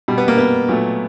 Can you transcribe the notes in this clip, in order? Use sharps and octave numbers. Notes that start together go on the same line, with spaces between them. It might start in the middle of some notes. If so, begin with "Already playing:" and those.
B2 G3
B3
A#3
B3
A#2 F#3 A3